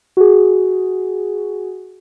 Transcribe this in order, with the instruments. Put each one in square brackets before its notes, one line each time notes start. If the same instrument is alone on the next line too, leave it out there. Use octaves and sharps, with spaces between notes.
[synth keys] F#4 G#4